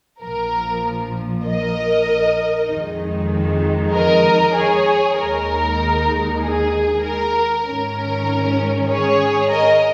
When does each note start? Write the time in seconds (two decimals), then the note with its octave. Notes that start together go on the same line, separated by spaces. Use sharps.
0.22 A#1 A#2 F3 A#4
1.46 A#4 D#5
2.70 F2 D#3 G#3 D#4
3.93 A#4 D#5
4.55 G#4 C#5
5.18 D#2 D#3 G#3 D#4 A#4
6.41 G#4
7.04 A#4
7.65 G#2 D#3 C#4 A#4
8.89 G#4 C#5
9.51 A#4 D#5